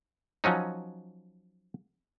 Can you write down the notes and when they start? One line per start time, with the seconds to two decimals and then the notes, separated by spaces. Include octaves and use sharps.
0.44 F3 F#3 C#4 D#4